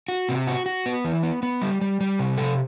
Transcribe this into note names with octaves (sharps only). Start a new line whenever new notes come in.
F#4
C3
F#4
F#4
B3
E3
B3
B3
G3
G3
G3
C3
A4